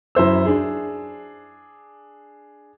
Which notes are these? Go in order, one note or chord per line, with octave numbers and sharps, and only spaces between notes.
F#2 E4 C5 E6
D4 G#4